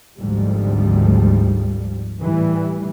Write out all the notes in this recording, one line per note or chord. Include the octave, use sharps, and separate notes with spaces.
G#1 D2 G#2 F3 G3
A2 E3 G3